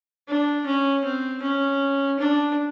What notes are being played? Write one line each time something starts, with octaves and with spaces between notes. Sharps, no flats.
D4
C#4
C4
C#4
D4